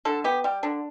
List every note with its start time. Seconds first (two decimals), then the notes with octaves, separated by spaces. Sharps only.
0.05 D3 A4
0.24 B3 G4
0.44 G3 G4
0.63 D3 D4